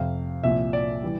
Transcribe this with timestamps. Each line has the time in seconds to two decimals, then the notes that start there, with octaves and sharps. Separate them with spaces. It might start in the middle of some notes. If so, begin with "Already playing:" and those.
Already playing: F1 F2 C3 F5
0.43 C2 A#2 F3 E5
0.73 D5
1.03 E3 G3